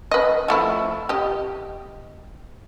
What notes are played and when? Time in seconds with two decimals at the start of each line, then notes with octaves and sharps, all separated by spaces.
0.11 B4 D#5
0.48 F3 A3 E4
1.09 G4 D#5